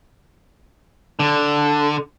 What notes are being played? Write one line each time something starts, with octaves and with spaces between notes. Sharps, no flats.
D3